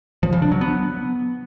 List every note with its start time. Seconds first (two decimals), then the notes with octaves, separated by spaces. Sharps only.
0.23 F3
0.32 C#3
0.42 D4
0.52 F#3
0.61 B3